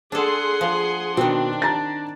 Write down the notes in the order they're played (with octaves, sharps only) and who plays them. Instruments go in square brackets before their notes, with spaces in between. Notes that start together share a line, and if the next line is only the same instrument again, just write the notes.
[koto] D4 A4 [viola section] G#4 F#5 C6
[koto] F3
[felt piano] B2 [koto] D#3 C4 [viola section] D4
[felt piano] A5 A#5 A6